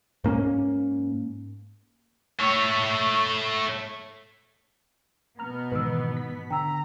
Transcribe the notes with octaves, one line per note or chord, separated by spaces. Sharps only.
G#2 A#3 C#4
A3 C#5
B2 B3 A#5 F6
G#2 D#3 E3 B4 E6
B6
D3 G5 A#5 E6